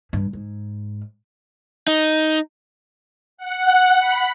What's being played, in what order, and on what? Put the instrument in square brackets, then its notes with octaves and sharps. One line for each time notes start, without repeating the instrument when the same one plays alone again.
[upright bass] G2
G#2
[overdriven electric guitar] D#4
[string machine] F#5
B5